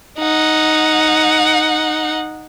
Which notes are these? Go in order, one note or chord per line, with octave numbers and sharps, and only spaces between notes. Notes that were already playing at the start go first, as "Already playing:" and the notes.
D#4 F#5